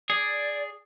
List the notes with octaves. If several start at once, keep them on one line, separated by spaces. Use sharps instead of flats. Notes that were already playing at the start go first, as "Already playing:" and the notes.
G#4 D5